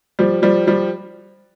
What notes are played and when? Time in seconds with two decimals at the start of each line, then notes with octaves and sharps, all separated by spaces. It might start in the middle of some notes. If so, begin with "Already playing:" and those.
0.19 F3 G3
0.42 F3 G3
0.67 F3 G3